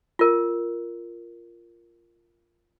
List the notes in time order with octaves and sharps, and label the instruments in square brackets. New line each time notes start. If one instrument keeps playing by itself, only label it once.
[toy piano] F4 A#4